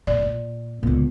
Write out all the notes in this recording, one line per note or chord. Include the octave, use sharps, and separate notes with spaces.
F1 A#2 D5
A#2
C#2 A#2 D3 B3